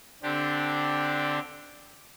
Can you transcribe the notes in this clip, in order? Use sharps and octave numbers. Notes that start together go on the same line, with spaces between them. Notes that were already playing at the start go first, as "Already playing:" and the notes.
D3 C4 D4 G4